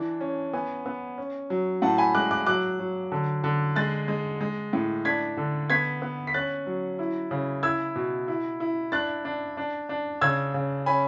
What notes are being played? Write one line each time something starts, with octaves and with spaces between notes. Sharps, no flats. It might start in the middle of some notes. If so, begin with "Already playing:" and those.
Already playing: E3 D4
C#4
B3 G#5
B3
C#4
F#3
A2 F#5 A5
G#5 B5
G#3 D6 F#6
D6 F#6
F#3 D6 F#6
F#3
D3
D3
G#3 F#6 A6
G#3
G#3
A2
D4 G#6 B6
D3
B3 G#6 B6
B3
B6
C#4 F#6 A6
F#3
E4
C#3
E4 E6 G#6
B2
E4
E4
D4 F#6 A6
D4
D4
D4
C#3 E6 G#6
C#3
C#4 G#5 B5